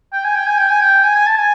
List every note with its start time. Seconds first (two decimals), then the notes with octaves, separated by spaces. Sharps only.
0.13 G5
0.24 G#5
0.35 G5
0.46 G#5
0.58 G5
0.69 G#5
0.80 G5
1.03 G#5
1.15 G#5
1.26 A5
1.38 G#5